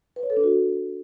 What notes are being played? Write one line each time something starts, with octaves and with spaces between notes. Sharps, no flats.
B4
C#5
A4
D4
F#4